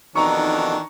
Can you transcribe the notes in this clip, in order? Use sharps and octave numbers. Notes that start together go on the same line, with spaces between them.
F2 B2 D#3 E3 D4 D#4 A#5 C#6